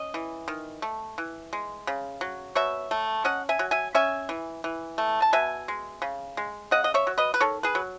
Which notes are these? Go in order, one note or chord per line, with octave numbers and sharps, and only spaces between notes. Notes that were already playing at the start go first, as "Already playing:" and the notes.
Already playing: C#4 D#5
E3
D#3
A3
E3
G#3
C#3
F#3
B2 C#5 E5
A3
C#4 D#5 F#5
E5 G#5
F#3
E5 G#5
C#4 E5 G#5
E3
E3
A3
A5
B2 E5 G#5
G#3
C#3
G#3
C#3 D#5 F#5
D#5
C#5 E5
F#3
B4 D#5
B4
D#3 A4 C#5
G#4 B4
F#3